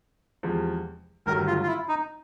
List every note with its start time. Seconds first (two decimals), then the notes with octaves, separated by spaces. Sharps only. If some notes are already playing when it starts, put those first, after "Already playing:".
0.43 E2 C3 F3 G#3
1.26 G1 G2 D#3 F#3 A3 A#4
1.47 F4
1.63 F4
1.67 E4
1.89 D#4